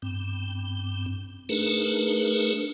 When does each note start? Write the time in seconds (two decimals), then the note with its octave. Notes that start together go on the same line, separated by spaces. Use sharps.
0.02 G2 C4
1.49 A3 D4 D#4 G#4 A#4 B4